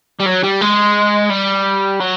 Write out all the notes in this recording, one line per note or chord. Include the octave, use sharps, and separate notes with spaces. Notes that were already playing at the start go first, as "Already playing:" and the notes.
G3
F#3
G3
G#3
G3
F#3